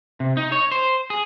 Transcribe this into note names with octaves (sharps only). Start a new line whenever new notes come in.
C3
D#4
C#5
C5
G#4